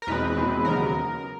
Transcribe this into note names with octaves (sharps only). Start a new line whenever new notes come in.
A#4
E2 B2 G#3 C4 B4
E2 B2 G#3 C4
D#2 C#3 F#3 B3 A#4